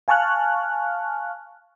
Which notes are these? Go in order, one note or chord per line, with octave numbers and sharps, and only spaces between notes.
F5 G#5 A5 C#6 F6 F#6